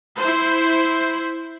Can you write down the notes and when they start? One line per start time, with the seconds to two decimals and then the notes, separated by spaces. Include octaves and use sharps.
0.17 E4 C5